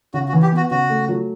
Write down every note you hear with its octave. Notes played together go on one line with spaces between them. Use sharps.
C#3 F#4
F#4
E3
G4
B3 F#4
C#3 F#4
A3
F#3